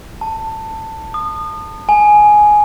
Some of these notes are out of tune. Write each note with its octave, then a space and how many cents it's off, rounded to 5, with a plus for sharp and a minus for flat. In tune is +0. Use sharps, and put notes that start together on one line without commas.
A5 +15
D#6 -30
G#5 +10